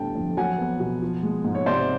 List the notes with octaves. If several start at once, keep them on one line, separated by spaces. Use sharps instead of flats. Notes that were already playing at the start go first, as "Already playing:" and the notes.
Already playing: A2 D3 G3 B3 G5 A5
F2
F#3 F#5 G#5
B3
B2
F3
G#3
G#2
C#5
C3 C5 D5